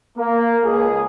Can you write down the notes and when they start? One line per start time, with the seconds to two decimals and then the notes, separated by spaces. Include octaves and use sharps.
0.18 A#3
0.65 C#2 G#4